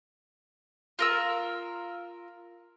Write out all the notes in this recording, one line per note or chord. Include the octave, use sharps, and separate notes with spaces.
F4 A#4 E6